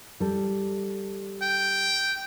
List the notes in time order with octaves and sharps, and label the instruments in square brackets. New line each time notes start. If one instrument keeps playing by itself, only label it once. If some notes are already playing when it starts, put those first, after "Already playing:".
[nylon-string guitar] G3 A4
[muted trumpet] G5